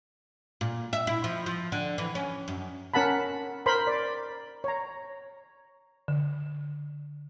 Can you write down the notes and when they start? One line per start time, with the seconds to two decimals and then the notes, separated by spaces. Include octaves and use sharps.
0.61 A#2
0.93 E5
1.07 E4
1.24 F3
1.46 F3
1.72 D3
1.98 E3
2.15 C#4
2.48 F#2
2.94 C#4 A#4 F#5 A5 B5
3.66 A#4 C5 B5 C6
3.87 D5
4.64 C#5 A#5
6.08 D3